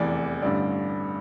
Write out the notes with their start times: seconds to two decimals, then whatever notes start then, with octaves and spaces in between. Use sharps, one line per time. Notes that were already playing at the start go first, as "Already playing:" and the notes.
Already playing: F1 E2 E3 D5
0.42 A1 G2 D3 D5